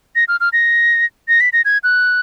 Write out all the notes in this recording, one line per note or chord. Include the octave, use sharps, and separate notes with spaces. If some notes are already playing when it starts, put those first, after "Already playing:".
A#6
F6
F6
A#6
A#6
B6
A#6
G#6
F#6